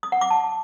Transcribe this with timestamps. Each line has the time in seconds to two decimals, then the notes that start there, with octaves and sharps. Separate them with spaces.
0.03 D#6
0.12 F#5
0.21 D6
0.31 A5